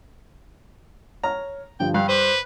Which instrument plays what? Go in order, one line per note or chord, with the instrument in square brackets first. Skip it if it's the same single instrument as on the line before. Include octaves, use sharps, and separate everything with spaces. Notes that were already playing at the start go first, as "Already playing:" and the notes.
[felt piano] C#5 F6 [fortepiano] A#5
[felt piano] G2 D3 F3 [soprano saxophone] G5
[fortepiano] G2 [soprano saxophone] F5 [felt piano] G5 F#6
[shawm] B4 [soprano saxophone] C5 [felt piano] D6